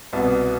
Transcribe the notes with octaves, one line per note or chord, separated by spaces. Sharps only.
C2 B2 B3